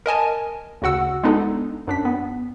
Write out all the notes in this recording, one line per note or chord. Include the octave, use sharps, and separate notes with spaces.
A#4 D#5 G#5 A5
D2 C#3 F#4 F#5 E6
G#3 B3 D4 D#4 A4
F#2 D4 B6
B3